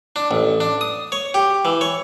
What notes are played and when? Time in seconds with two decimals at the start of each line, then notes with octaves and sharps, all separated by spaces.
0.16 D4
0.31 A1
0.60 D4
0.81 D#6
1.12 C#5
1.34 G4
1.65 E3
1.81 C#5